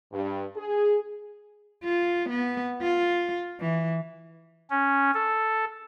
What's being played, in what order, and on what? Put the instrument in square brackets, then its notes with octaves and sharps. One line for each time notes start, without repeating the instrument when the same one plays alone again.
[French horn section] G2
G#4
[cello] F4
B3
F4
E3
[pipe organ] C#4
A4